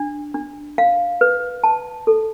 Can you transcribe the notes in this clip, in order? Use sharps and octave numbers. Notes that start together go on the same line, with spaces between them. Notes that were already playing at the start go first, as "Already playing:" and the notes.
Already playing: D4
D4
F5
B4
A5
A4